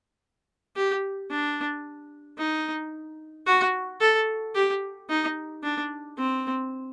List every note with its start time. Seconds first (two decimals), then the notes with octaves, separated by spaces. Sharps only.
0.76 G4
1.31 D4
2.38 D#4
3.46 F#4
4.01 A4
4.55 G4
5.09 D#4
5.63 D4
6.17 C4